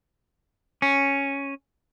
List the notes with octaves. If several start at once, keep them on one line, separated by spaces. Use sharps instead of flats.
C#4